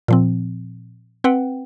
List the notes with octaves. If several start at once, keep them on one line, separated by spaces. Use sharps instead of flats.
A#2 F3 C4
C4 B4 F#5 G5